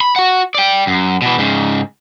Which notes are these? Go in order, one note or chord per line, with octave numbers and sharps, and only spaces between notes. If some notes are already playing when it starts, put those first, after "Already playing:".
B5
F#4 F#5
D5 G5
F#2
B2 E3
G#2 C#3